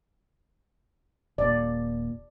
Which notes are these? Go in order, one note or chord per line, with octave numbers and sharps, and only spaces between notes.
D#1 A#2 D5